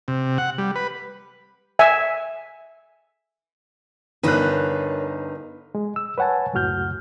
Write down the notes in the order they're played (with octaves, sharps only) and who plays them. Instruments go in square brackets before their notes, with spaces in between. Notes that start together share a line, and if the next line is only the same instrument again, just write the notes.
[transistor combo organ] C3
F#5
G3
B4
[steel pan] E5 G#5
[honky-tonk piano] G1 F#6 [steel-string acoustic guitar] D4 D#4 B4 [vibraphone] A#4 C#5
[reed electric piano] G#3
E6
B4 C#5 F#5 G#5 A5
C#2 F#2 A2 F#4 F6 G6